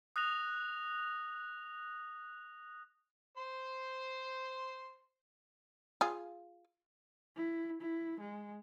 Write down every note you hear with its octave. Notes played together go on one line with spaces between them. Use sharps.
D#6 F#6 A#6 F7
C5 C6
F4 G#4
E4
E4
G#3